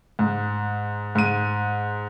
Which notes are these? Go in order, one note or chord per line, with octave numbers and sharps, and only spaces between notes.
G#2
G#2 D#7